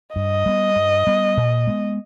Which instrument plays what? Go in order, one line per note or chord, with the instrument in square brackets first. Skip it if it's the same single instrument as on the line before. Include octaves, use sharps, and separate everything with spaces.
[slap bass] G2 [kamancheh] D#5
[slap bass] G3 B3
G2
G3 B3
A#2
G#3 B3